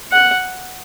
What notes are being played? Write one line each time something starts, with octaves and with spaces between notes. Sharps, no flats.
F#5